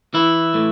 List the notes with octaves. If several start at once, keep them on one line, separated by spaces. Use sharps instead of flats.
E3 E4
A2